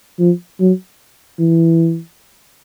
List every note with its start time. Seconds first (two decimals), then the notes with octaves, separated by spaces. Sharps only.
0.19 F3
0.60 F#3
1.39 E3